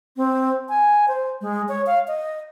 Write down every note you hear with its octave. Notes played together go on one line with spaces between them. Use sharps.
C4
G#5
C5
G#3
C#5
F5
D#5